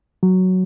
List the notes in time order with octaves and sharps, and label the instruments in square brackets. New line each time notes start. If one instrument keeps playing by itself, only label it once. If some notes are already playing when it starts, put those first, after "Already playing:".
[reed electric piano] F#3